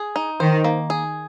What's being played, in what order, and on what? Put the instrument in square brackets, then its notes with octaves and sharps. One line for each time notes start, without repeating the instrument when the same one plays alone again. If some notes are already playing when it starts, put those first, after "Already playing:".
Already playing: [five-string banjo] G#4
D#4
[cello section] D#3 [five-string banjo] C5
[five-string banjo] A#3
G#4